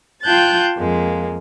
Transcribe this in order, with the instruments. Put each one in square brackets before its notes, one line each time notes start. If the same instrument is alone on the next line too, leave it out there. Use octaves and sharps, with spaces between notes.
[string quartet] F4 G5 A5 F#6 G6 A6
F2 G#3 A#3